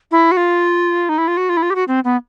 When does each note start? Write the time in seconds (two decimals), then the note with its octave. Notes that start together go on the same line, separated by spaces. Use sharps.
0.11 E4
0.31 F#4
0.37 F4
1.09 D#4
1.18 E4
1.28 F4
1.37 F#4
1.49 F4
1.57 E4
1.62 F4
1.70 G4
1.75 F#4
1.88 C4
2.05 B3